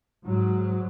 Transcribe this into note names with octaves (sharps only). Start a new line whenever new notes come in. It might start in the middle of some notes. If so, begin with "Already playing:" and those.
G#2 F#3